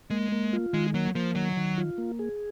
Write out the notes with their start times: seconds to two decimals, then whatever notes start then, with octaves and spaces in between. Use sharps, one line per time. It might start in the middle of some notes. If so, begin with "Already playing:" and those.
0.10 G#3 A#3
0.32 A#3
0.53 F4
0.73 D#3 G#3
0.94 F#3 A#3
1.15 F3 A#3
1.35 D#3 F#3
1.57 D#3
1.78 F4
1.98 A#3
2.19 G#4